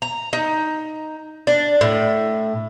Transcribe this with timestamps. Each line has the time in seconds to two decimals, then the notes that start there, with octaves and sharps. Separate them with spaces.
0.02 A#5
0.33 D#4
1.47 D4
1.81 A2